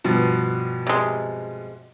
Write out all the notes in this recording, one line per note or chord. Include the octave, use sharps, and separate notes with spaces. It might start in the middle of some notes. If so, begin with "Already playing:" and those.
G2 B2 F3
C3 G#3